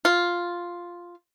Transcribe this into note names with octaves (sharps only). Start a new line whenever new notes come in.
F4